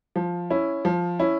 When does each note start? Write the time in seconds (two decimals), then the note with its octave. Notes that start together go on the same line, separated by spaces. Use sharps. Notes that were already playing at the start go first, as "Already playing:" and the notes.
0.16 F3
0.50 C#4 E4
0.85 F3
1.19 C#4 E4